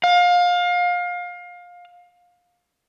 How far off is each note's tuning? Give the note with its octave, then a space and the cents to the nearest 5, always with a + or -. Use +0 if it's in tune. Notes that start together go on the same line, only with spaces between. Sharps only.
F5 +25